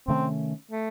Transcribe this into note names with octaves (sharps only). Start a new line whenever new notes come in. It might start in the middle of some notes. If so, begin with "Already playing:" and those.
C3 D#3 A3 C4 C#4
A3